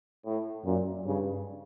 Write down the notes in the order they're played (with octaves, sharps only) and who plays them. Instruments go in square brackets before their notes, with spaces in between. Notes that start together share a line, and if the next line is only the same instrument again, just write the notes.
[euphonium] A2
[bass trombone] F#2 [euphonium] A#2
[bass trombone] G2 [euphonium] C#3